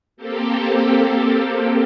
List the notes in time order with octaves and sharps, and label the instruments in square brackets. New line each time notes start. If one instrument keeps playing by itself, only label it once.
[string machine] A#3 C4 G4 A4